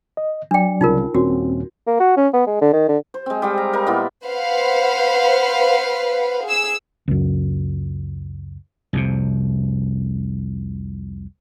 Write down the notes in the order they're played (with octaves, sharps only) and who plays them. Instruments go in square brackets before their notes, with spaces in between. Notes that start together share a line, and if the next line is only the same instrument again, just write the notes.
[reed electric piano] D#5
[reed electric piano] F#3 D5 [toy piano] D4 G5
[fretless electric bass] C2 C#3 [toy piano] D#4 F4 A#4
[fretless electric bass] D#1 C#4 [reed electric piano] C4 [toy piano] F#4
[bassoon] A#3
F#4
C#4
B3
G#3
D3
D#3
D3
[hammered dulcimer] C5
G#3 C4
G3 G#3 F5 G5
A#5
A#4 D#5 B5
A#2 B3 E4 F4
[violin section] B4 C5 F5 F#5
G#4 E6
[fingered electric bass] C#2 F#2
[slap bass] C2 F2 C3